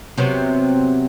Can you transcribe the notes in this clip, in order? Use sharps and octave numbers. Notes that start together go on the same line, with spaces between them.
C3 F#3 B3